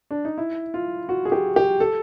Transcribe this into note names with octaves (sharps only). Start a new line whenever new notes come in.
D4
D#4
E4
F4
F#4
G#4
G4
G4
A4